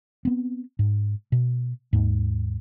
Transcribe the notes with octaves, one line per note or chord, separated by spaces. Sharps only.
B3 C4
G#2
B2
D#2 G#2